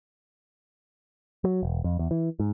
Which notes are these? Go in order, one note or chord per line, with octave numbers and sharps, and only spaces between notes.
F#3
E1
F2
E2
E3
G#2